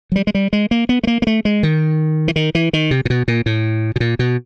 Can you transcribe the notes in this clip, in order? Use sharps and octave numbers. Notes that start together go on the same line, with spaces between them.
F#3
G3
G#3
G3
G#3
A#3
B3
A3
A#3
A#3
A3
G#3
D#3
E3
D#3
E3
D#3
C3
A#2
B2
A#2
A2
B2
A#2
B2